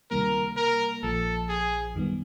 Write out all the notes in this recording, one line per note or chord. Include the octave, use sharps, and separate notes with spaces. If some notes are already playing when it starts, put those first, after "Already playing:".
C#2 C3 D#3 G3 A#3 A#4
A#4
A#1 A#2 F3 A4
G#4
F#2 D#3 G3 B3